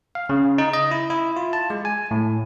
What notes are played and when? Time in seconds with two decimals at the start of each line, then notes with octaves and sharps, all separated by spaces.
0.15 F5
0.29 C#3
0.58 D#4
0.73 D#5
0.91 E4
1.10 E4
1.36 F4
1.53 A5
1.70 G#3
1.85 G#5
2.11 A2